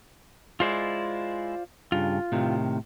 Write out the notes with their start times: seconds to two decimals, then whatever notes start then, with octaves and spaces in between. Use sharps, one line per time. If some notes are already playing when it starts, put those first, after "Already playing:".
0.60 G#3 E4 F4 C5 D5
1.92 G2 C#3 F4
2.32 A2 C3 D#3